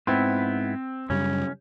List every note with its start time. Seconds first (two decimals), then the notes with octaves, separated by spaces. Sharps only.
0.07 G#2 B3 C4 E4
1.10 F#2 C#3 G3 C#4